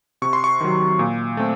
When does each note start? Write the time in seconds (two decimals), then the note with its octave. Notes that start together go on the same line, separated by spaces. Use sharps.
0.22 C3 C#6
0.33 C6
0.44 C#6
0.61 D#3 F#3
0.99 A#2
1.37 A3 C4